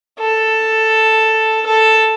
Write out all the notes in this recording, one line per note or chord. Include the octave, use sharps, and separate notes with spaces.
A4
A4